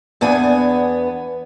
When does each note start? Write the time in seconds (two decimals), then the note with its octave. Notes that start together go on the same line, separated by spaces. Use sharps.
0.21 E2 B3 D4 G#5